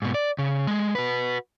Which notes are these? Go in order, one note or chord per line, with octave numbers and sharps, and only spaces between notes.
G#2 B2
D5
C#3
G#3 A3
F#4 B4